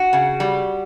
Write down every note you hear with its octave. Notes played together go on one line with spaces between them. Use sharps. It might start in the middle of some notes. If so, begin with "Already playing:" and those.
Already playing: F#4
C#3
G3